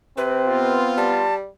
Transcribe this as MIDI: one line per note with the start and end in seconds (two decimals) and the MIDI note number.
0.17 0.80 48
0.17 1.10 60
0.17 0.82 71
0.46 1.27 59
0.46 1.27 65
0.97 1.47 55
0.97 1.35 81